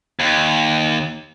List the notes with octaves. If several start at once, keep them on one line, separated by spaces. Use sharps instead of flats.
D#2